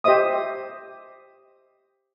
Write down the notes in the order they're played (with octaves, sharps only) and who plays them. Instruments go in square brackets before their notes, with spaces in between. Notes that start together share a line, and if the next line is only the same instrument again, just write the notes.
[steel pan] G4 C5 D#5 E5 D#6